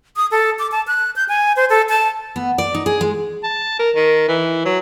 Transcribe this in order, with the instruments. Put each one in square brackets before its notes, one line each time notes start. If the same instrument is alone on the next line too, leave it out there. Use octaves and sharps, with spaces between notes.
[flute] D#6
A4
D6
A5
F#6
G6
G#5
C5
A4
A5
[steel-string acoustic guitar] B3
D5
D#4
G#4
G#3
[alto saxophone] A5
A#4
D#3
E3
F#3